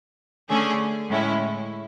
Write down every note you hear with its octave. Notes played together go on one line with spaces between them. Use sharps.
D3 A3 C#4 G#4
A2 G#3 C#4 E4